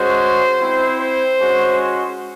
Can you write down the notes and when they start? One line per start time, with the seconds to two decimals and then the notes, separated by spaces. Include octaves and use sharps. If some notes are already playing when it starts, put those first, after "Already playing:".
Already playing: G#3 C#4 F#4 C5
0.60 C4 E4
1.00 C5
1.39 G#3 C#4 F#4